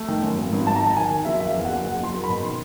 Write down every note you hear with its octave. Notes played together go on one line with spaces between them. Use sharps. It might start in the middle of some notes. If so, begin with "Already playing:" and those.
Already playing: A3
D#3
F#2
G#1
G#1
G#1 A5
A#5
D#3 A5
D#3 G#5
D#3
F#1 E5
F#1 E5
F5
E2
F#1 F#5
F#1 F#5
F#1 C6
F#1
B2 B5
D#3 C6